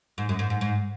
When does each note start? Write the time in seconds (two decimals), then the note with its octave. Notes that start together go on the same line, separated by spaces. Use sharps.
0.18 G#2
0.29 F#2
0.39 G#2
0.50 G#2
0.61 G#2